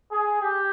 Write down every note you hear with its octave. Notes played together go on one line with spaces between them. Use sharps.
G#4
G4